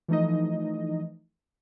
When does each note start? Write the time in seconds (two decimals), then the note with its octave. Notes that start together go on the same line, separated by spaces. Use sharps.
0.08 E3 F3 A3 D#4 D#5